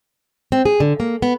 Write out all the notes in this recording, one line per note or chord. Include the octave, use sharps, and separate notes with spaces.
C4
G#4
D3
A#3
B3